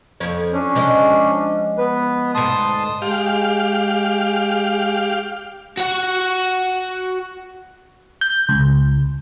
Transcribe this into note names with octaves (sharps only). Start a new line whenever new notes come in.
F2 C#5
C#4 D4
F3 G#3 D#5
B3 B4
D2 G#2 A5 C6 D#6
G#3 G4 F5
F#4 F#5
G6
C#2